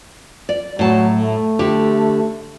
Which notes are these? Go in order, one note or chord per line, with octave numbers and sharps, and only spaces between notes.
D5
A2 F#3 A5
A3
D3 G4